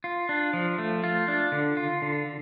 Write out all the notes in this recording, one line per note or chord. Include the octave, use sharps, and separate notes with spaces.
F4
D4
F3
A3
F4
D4
D3
F4
D3